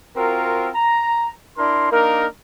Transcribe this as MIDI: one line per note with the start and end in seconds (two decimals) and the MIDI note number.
0.17 0.69 60
0.17 0.69 65
0.17 0.69 66
0.17 0.69 70
0.75 1.31 82
1.58 1.89 62
1.58 1.89 64
1.58 1.89 70
1.58 1.89 84
1.92 2.27 58
1.92 2.27 62
1.92 2.27 63
1.92 2.27 70